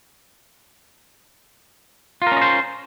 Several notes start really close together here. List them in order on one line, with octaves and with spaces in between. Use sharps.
F4 A#4 C#4 D#5 C5